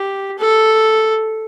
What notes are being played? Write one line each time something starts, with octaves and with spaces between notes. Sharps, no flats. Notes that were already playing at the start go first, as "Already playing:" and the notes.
Already playing: G4
A4